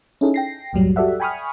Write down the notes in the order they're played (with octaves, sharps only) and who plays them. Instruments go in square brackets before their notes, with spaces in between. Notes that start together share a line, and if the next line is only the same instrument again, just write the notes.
[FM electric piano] C#4 D#4 E4 G#4 A4
G5 A#6 C7
C2 F#2 A2 F#3 G3
F#4 G4 A4 D5 E5 F#5
G5 G#5 B5 C#6 D#6 F6